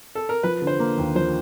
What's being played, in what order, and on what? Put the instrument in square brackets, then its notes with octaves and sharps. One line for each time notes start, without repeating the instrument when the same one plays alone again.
[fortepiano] A4
A#4
[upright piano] F3 [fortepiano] B4
[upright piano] D3
[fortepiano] C5
[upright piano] A#3
D#2
[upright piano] F3 [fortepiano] C5